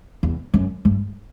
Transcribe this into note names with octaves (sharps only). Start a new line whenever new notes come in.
E2
F#2
G2